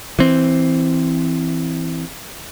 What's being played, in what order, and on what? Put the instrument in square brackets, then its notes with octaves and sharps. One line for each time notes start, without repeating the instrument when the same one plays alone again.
[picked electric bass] E3 C4